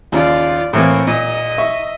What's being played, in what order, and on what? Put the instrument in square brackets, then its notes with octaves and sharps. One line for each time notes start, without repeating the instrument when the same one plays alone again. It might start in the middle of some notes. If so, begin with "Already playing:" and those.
[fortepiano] D#2 C#3 [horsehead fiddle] F4 D5
[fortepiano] A2 E3 A#3 [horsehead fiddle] C4
[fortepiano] A#2 [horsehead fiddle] D#5
[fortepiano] E5 C#6